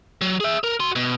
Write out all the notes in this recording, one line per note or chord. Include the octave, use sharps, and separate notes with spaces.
F#3
G#4 E5
A#4
F#4 C6
B2